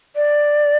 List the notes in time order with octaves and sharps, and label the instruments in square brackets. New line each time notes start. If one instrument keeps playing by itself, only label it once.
[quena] D5